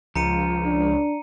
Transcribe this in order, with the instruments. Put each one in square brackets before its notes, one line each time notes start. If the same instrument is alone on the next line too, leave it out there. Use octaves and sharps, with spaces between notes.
[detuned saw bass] C#2 [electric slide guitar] F3 [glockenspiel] A#5 C#7 D#7
[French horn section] D4